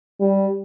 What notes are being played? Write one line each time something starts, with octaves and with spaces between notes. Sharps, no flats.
G3